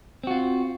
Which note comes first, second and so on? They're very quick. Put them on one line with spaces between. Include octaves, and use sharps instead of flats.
C4 F#4 F4